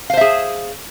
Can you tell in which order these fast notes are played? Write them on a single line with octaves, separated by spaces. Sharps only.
F5 C5 E5 G#4